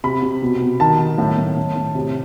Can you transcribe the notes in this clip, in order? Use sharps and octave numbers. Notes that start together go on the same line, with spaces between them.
C3 B5
C3
B2
B2
D#3 A5
D#3
A2
A2
A2
A2
C3